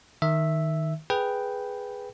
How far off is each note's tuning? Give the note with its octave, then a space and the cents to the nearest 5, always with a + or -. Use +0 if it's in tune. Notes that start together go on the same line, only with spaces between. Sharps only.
D#3 +0 E5 +0
G#4 +0 B4 +0 G5 +0